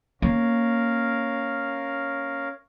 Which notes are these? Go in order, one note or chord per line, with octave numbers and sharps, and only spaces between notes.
A#3 C#4 A#4 F5